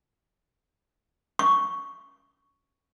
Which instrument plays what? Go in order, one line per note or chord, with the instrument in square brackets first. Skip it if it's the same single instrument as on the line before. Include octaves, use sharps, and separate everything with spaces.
[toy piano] C#6